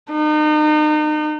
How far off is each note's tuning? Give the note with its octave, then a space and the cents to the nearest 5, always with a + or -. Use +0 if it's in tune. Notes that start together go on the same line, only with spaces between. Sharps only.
D#4 -35